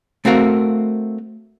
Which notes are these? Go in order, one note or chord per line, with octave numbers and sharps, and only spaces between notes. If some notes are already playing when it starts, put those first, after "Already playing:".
A3 C4 F#4 A#4 F5